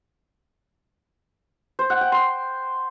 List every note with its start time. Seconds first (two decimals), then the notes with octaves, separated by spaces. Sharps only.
1.79 C5
1.90 F#5
2.01 G5
2.12 C6